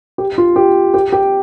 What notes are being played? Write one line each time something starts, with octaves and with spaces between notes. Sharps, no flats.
G4
F4
G4
G4
G4 G5